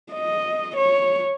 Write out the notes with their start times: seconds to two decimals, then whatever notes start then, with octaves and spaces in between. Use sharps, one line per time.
0.13 D#5
0.77 C#5